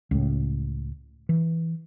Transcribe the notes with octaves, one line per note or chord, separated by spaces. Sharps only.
C#2 A2
E3